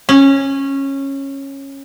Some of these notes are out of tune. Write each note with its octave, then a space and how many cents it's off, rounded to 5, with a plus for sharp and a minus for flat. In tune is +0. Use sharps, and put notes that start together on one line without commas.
C#4 -15